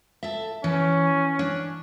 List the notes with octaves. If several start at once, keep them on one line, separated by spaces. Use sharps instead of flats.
A4 E5
E3 C#4
D4